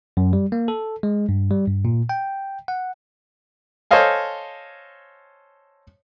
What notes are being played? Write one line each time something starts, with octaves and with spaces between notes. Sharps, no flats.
F#2
G3
A#3
A4
G#3
G2
G3
G2
A#2
G5
F#5
A4 C5 C#5 D#5 F5 G#5